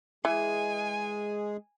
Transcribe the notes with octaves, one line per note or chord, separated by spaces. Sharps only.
E3 G#3 G#4 G#5